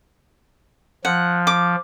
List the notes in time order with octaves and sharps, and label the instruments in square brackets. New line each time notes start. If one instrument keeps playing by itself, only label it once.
[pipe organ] F3 [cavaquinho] F#5
[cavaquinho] D6